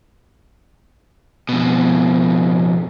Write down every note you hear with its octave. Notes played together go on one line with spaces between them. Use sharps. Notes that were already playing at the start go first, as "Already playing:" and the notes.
F2 B2